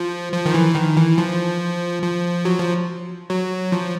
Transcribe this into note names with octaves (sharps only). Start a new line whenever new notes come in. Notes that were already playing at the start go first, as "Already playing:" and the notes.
Already playing: F3
F3
D#3
E3
D#3
E3
F3
F3
F#3
F3
F#3
F3